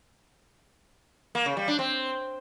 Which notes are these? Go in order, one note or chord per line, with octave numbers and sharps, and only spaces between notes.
A#3
C#3
G3
D4
C4